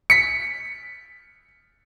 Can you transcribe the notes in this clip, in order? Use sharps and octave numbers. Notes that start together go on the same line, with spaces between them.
B6 C#7